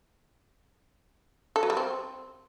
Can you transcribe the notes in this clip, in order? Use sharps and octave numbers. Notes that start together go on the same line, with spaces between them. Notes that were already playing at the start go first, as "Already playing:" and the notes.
A4
F#3
G3
C4